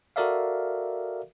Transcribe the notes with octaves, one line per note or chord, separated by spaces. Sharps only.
F#4 A4 A#4 D5 E5 F5